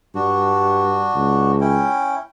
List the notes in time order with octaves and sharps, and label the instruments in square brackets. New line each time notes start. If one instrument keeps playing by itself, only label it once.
[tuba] G2 [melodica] D4 F#4
[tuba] C#2
[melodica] C#4 E4 G5